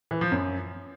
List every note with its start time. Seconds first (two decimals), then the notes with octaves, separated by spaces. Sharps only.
0.11 E3
0.21 F3
0.32 F#2